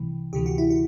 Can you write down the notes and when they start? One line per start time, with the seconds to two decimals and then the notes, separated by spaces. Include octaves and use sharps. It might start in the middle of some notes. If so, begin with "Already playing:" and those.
Already playing: C2 C3 E3
0.33 D2 C3 E3 G4
0.46 F#4
0.58 E4
0.70 F#4